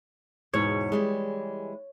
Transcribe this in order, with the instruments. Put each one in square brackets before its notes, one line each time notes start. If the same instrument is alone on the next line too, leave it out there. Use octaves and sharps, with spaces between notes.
[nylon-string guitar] E2 G#2 B2 [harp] C#5
[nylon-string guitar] E3 G3 G#3